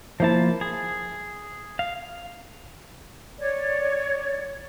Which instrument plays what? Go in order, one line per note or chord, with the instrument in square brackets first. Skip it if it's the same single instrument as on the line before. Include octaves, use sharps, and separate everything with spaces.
[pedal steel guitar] F3 A#3 A5 [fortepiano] E4 C5
[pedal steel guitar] G#4
F5
[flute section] C#5 D5